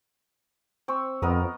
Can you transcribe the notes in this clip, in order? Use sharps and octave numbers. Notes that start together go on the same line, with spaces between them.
C4 C#6 E6
F2 B3 A#4 D#5